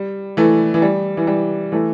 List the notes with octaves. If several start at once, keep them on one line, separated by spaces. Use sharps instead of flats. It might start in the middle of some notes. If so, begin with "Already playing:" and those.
Already playing: G3
E3 A3
E3
G3
E3
G3
E3 A3